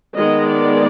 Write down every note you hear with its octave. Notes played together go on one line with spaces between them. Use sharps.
D#3 G#3 B3 D#5
D5